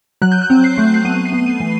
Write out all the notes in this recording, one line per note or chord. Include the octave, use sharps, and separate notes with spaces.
F#3 F#6
G6
F#6
C4
C7
A3
C7
B3 D#7
C7
B3
D#7
E3